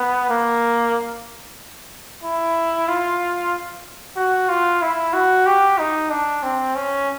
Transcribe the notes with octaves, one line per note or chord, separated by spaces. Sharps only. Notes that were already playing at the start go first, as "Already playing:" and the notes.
Already playing: B3
A#3
E4
F4
F#4
F4
E4
F#4
G4
D#4
D4
C4
C#4